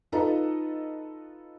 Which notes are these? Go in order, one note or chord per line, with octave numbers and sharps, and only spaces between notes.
D#4 F4 A4 B4 D#5 A#5